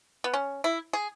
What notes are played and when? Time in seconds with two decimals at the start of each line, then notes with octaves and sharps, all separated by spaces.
0.24 B3
0.34 C#4
0.64 E4
0.93 G#4